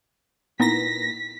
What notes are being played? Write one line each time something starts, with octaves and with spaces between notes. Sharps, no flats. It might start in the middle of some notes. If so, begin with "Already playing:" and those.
A#2 B3 D#4 E4 A#6 B6